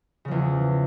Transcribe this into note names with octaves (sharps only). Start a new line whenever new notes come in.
E2 C#3 F3